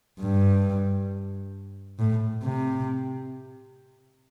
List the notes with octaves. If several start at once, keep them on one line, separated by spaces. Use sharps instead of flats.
G2
A2
C3